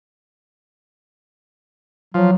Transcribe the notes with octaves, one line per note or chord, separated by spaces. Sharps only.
F3 F#3